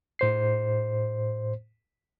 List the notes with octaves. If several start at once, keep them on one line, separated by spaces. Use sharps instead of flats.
A2 C5 C7